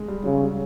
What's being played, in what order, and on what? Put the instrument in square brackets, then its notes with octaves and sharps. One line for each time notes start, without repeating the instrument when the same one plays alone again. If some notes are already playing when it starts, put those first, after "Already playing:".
Already playing: [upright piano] G#3
G3
[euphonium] C#3 [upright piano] F#3
[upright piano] G3